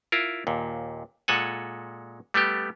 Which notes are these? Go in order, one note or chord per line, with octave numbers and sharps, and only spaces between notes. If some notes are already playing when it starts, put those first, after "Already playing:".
E4 F4 A#4
D#2 A#2
A#2 G#3 A4 F#5 G#5
G3 A3 B3 G4